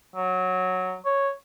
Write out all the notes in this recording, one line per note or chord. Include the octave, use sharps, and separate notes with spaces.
F#3
C#5